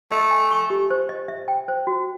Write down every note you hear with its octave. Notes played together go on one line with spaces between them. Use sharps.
A3 D#5
G#5
C#6
G4
C5
D#5
E5
G5
C5
F#4